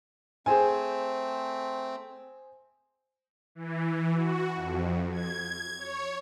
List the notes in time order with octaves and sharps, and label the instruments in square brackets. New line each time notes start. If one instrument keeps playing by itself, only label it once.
[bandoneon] A3 C4 [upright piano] G#4 C5 G#5
[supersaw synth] E3
F#4
F2
G#6
C#5